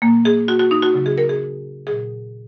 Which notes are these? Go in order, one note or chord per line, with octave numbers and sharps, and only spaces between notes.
A#2 F#3 A#3
G#4
F#4
F#4
D#4
F#4
C#3 F#3
G#4
A#4
G#4
A#2 F#3 G#4